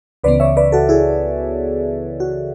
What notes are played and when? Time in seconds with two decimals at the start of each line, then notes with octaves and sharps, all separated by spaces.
0.24 C#2 C#3 E3 B3 B4 D5
0.40 C#5 E5
0.57 B4 D5
0.72 F#4 A4
0.89 E4 G#4
2.20 F#4